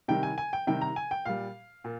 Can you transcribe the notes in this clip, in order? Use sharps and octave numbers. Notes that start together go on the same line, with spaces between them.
C3 D#3 G3 G5
G#5
G#5
G5
C3 D#3 G3 G5
A#5
G#5
G5
A#2 G3 F5
A#2